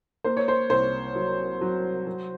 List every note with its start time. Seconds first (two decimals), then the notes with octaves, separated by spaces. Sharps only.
0.24 A#3 C5
0.37 C#5
0.48 C5
0.70 C2 C5
1.15 F#3
1.61 F#3
2.07 F#3